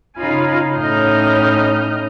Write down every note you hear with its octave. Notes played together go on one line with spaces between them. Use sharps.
C#3 D#4 F4 F5 G#5 B5
A2 C#4 D#4 D#5 F6 G6